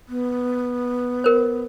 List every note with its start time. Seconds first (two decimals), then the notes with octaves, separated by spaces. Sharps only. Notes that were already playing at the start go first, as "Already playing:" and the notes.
0.09 B3
1.24 A#4 C5